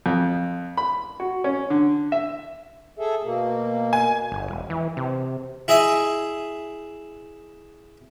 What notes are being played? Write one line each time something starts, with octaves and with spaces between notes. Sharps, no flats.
F2
B5
F#4
C#4
D3
E5
G#4 A4 E5
B2 A#3
G#5
G1
E1
E3
C3
E4 G#4 D#5 E5 D#6